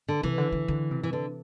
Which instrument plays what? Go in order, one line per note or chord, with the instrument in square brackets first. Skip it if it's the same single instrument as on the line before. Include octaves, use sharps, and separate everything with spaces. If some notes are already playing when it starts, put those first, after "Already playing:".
[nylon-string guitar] D3
[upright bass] C3 [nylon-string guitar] E3
[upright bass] D3
D3
D3
C3
[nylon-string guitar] E3
D3